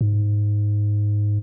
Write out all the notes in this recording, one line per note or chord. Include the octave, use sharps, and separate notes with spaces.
G#2